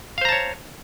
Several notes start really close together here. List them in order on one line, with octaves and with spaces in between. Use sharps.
F5 C5 A#5 A5 C#5